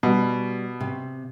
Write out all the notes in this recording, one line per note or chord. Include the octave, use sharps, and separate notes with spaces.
B2 G3
C3